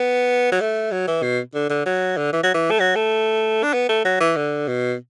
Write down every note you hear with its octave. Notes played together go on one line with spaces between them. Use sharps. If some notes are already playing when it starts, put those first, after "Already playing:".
Already playing: B3
F#3
A3
F#3
E3
B2
D3
D3
F#3
D3
E3
F#3
E3
A3
F#3
A3
D4
B3
A3
F#3
E3
D3
B2